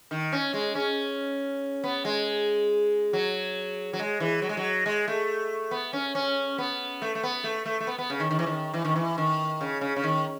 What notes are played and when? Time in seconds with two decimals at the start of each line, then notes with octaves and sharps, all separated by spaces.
0.11 D#3
0.32 C#4
0.54 G#3
0.75 C#4
1.84 B3
2.05 G#3
3.13 F#3
3.93 F#3
3.99 G#3
4.20 E3
4.42 F#3
4.49 G#3
4.57 F#3
4.86 G#3
5.08 A3
5.71 B3
5.93 C#4
6.15 C#4
6.58 B3
7.02 A3
7.15 A3
7.23 B3
7.44 A3
7.65 A3
7.80 A3
7.87 B3
7.98 B3
8.10 C#3
8.20 D#3
8.31 D#3
8.39 E3
8.46 D#3
8.74 E3
8.85 D#3
8.95 E3
9.18 D#3
9.61 C#3
9.81 C#3
9.96 C#3
10.04 D#3